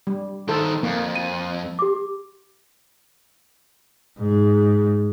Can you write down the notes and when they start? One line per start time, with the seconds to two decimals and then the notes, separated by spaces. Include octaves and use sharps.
0.07 G3
0.49 D#3 A4 C5
0.83 F2 A#3
1.15 D#7
1.79 G4 D6
4.19 G#2